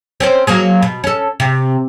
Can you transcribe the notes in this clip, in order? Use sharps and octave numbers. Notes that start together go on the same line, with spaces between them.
C4 C#4 C5
F#3 A#3 G#4
B2
C#4 A4
C3